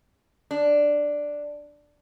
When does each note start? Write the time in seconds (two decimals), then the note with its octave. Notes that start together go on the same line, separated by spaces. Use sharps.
0.51 D4